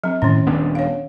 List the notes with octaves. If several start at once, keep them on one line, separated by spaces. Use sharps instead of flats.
F#3 C4
A2 D#3 C#4
D#1 B3 D4
C#5 F5